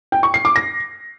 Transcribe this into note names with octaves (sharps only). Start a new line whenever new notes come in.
G5
C#6
C7
D6
A#6